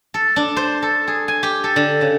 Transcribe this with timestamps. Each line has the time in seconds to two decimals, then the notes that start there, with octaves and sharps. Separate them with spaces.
0.14 A4
0.36 D4
0.56 C5
0.82 A4
1.07 G#4
1.28 G#5
1.43 G4
1.64 A4
1.76 D3
2.01 C#3